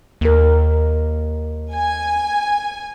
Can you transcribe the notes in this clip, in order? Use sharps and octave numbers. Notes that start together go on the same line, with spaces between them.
D#2 A#3 A#4
G#5